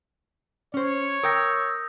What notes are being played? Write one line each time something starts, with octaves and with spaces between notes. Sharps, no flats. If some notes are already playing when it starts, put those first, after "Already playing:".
C#4 C5 C#5
A#4 G5 D#6 E6 G6 A#6